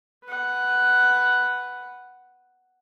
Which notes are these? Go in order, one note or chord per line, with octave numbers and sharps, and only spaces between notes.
B4 F#5